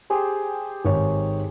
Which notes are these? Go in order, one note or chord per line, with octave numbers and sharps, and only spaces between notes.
G4 G#4 C5
G#1 C#5